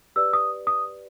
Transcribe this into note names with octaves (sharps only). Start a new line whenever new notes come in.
G4 B4 D5 E6
D#6
D#6